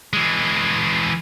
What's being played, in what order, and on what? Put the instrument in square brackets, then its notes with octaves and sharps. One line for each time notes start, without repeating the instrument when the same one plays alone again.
[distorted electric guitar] E3 G#3